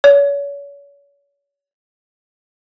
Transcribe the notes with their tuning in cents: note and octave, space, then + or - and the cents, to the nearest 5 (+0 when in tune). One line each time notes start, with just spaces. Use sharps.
C#5 +35